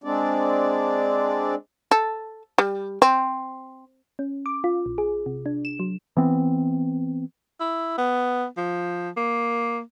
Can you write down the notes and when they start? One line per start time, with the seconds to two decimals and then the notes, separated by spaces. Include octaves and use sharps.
0.04 G#3 C4 D4 D5
1.91 A4
2.58 G3
3.02 C4
4.19 C#4
4.46 D6
4.64 F4
4.86 A#1
4.98 G#4
5.26 C3
5.46 D4
5.65 E7
5.80 F#3
6.17 E3 B3 C4
7.61 E4
7.98 B3
8.57 F3
9.17 A#3